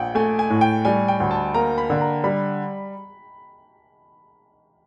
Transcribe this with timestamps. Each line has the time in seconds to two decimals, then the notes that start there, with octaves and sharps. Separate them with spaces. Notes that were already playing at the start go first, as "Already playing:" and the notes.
Already playing: A#1 F#5 G5
0.15 A3 G#5
0.39 G#5
0.50 A2
0.61 G5
0.85 G3 G#5
1.08 G5
1.20 D2
1.31 A5
1.54 A#3 A#5
1.78 B5
1.90 D3
2.01 A#5
2.24 G3 B5